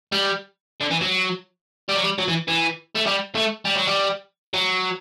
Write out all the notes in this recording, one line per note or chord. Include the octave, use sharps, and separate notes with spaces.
G3
D3
E3
F#3
G3
F#3
G3
F#3
E3
E3
A3
G3
A3
G3
F#3
G3
F#3